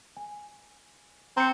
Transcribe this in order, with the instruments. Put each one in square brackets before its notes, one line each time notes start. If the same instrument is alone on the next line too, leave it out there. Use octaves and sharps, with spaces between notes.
[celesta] G#5
[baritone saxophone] C4 [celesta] A#5 C#7